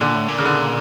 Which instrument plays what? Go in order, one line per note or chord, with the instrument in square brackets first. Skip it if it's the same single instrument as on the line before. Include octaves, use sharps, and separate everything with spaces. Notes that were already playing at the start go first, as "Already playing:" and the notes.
[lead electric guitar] A#2 [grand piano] D3
[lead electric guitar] A2
A#2
[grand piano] C#3
D3